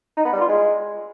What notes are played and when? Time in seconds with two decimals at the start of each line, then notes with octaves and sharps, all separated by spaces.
0.17 D#4
0.25 B3
0.33 G3
0.41 F4
0.49 G#3